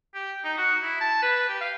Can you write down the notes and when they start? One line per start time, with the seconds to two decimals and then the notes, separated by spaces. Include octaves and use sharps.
0.14 G4
0.44 D#4
0.58 F#4
0.83 E4
1.01 A5
1.22 B4
1.48 G4
1.61 F5